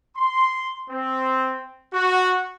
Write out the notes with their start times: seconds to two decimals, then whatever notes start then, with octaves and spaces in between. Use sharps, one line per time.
0.17 C6
0.90 C4
1.93 F#4